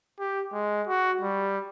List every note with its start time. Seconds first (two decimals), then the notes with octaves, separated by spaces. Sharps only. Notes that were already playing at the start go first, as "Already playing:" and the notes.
0.20 G4
0.52 G#3
0.87 F#4
1.21 G3